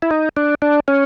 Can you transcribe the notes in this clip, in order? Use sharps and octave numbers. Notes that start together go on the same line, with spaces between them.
E4
D#4
D4
D4
C#4